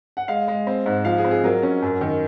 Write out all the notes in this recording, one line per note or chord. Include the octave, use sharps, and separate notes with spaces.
F#5
G#3 F5
G#3
C4
G#2
F3 F5
G#4
C4
G#4
F#3 A#4
C#4
F#2
D#3